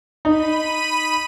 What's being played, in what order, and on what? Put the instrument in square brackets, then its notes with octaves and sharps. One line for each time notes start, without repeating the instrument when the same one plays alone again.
[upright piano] D#4 [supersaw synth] B5 D#7